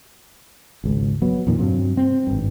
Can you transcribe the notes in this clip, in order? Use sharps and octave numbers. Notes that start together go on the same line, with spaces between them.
G#1 C#2
F#3 B3
F2 A#2 D#3
G2 C3 F#3
C4
G#1 G2